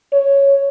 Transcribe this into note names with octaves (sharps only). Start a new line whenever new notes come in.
C#5